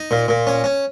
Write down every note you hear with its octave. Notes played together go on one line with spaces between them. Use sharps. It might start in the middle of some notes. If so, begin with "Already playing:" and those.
Already playing: D#4
A#2
A#2
C#4
C#4